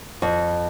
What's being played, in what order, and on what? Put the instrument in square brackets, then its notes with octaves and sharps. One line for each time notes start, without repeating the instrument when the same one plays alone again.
[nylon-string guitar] F2